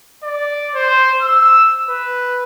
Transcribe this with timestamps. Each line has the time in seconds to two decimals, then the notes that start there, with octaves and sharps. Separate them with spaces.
0.23 D5
0.75 C5
1.22 E6
1.90 B4